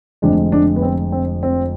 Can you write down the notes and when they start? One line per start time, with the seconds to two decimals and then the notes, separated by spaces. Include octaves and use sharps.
0.22 F1 F2 D3 G#3 D4
0.52 D4
0.76 B3
0.82 C4
1.12 C4
1.43 C4